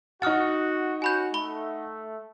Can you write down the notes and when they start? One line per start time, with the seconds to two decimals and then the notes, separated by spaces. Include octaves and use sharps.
0.22 D#4 F#4 F#5 D#6 F6 A6
1.02 C#4 F#4 G#5 B5 G6
1.34 A3 B5 G7